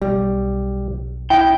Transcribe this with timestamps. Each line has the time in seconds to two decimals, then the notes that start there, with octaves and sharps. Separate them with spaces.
0.02 B1 G3
1.30 E4 G5